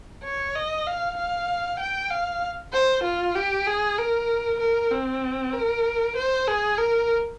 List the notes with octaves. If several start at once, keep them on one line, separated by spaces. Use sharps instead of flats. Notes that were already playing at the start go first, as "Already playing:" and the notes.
C#5
D#5
F5
F5
G5
F5
C5
F4
G4
G#4
A#4
A#4
C4
A#4
C5
G#4
A#4